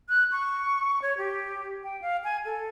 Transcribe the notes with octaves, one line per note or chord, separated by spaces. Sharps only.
F#6
C#6
C#5
G4
G5
F5
G#5
A4